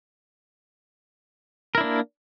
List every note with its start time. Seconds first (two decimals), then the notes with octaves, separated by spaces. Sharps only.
1.75 A#4
1.78 E4
1.81 D4
1.83 A#3